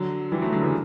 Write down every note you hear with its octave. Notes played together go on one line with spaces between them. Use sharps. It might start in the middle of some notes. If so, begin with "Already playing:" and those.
Already playing: D3 F#3
E3 G3
F#3 A3
D3 F#3
C#3 E3